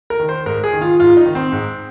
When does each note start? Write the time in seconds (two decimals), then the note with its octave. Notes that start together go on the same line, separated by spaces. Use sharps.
0.10 A#4
0.20 D#3
0.29 C5
0.46 G#2 A#4
0.64 G#4
0.73 D#3
0.81 F4
1.00 G#2 F4
1.17 D#4
1.26 D#3
1.35 C4
1.52 G#2